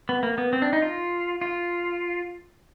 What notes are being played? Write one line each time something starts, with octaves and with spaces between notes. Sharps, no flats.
B3
A#3
B3
C4
D4
D#4
F4
F4